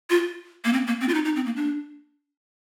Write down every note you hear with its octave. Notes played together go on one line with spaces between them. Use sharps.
F4
A#3
C4
A#3
C4
F4
D#4
D#4
C4
A#3
D4